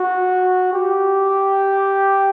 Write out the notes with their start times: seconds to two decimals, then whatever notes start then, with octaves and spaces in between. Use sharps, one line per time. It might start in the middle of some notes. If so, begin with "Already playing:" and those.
Already playing: F#4
0.73 G4